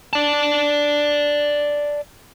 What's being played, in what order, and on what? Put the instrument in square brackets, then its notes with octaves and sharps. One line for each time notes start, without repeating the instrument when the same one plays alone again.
[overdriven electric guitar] D5 A5